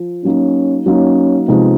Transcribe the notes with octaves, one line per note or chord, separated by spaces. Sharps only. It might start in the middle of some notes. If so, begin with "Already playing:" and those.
Already playing: F3
F#3 A#3 C#4 D#4
F#3 A#3 C#4 D#4
C3 F3 G#3 B3 D#4